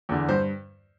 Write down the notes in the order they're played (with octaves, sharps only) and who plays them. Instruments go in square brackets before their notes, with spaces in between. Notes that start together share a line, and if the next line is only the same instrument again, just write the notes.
[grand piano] E2 D3
G2 C5